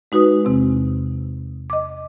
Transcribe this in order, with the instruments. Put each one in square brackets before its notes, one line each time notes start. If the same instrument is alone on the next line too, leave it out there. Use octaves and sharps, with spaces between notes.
[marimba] G#3 D#4 F#4 B4 D#6
E2 C3 C4
D#5 D6